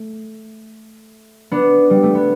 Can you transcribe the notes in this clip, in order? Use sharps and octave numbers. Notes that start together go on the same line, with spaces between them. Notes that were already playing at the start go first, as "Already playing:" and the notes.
Already playing: A3
B3 D4
G3
A3
B3